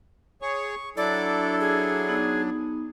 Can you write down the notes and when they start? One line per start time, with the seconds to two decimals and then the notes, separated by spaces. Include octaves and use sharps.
0.42 G#4 C#5 C#6
0.97 F#3 D4 E4 A4 D5
1.60 G#4
2.09 B3 D#4